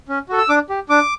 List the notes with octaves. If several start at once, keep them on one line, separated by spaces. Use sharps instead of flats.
C#4
F#4 A4
E6
D4 D6
G4
D4 D6